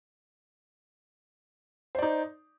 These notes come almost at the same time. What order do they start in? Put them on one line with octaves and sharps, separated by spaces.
C5 D5 D#4